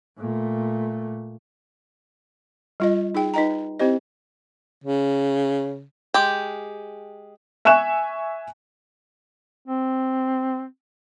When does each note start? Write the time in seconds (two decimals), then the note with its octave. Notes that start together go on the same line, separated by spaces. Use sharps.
0.18 A#2 A3
2.80 G3 F4 D#5
3.15 D#4 G#4 G5
3.34 D#4 B4 D#5 G5 A#5
3.79 C4 E4 G4 C5 D#5
4.84 C#3
6.14 G#3 G4 G5
7.65 E5 G#5 C#6 F#6 E7
9.67 C4